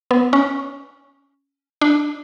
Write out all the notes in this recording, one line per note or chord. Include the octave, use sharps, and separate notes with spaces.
B3
C#4
D4